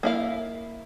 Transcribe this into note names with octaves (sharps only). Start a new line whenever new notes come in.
A#3 E4 F5